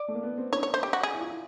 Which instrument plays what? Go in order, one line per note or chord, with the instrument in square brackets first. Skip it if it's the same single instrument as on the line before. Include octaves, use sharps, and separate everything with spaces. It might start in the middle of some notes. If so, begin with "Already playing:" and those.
Already playing: [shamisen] D5
[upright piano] A3
A#3
B3
C4
[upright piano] D4 [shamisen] C#5
[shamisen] C#5
C5
G4
F#4
G#4
[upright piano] E4
F4
E4